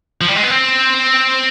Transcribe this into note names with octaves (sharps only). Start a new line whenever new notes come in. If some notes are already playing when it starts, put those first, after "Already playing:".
F3
G3
G#3
B3
C4